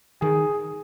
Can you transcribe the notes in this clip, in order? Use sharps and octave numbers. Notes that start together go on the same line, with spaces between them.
D#3 G#4